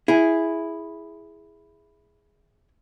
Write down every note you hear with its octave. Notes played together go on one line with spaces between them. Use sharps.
E4 G#4